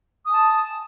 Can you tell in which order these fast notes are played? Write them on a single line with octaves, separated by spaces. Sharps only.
D#6 G#5 A5